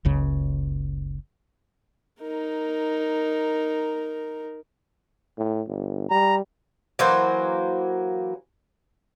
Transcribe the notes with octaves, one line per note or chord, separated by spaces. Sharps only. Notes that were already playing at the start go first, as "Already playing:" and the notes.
F#1 C#2 C#3
D#4 A#4
A2
G1
G3 A#5
E3 F#3 A#3 C5